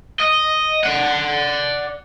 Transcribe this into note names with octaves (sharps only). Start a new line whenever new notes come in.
D#5
D5 F#5